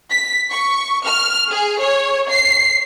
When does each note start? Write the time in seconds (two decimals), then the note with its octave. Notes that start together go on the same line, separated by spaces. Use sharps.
0.11 B6
0.51 C#6
1.05 F6
1.50 G#4
1.80 C#5
2.30 C7